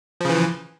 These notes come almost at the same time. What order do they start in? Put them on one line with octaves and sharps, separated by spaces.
F3 C#3 E3